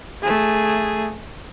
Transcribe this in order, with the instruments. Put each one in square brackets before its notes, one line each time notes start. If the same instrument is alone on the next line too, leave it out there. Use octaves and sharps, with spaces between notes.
[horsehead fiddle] A3 G#4